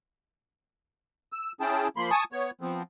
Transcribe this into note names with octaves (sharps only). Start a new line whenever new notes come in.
E6
C#4 E4 G#4 G5 A5
F3 A#3 B5 C6
G#5 A5 C#6 D#6
B3 C#5
F3 B3 C4